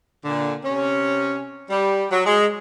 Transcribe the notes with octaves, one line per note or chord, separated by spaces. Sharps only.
A#2 D3
C3 C#4
G3
F#3
G#3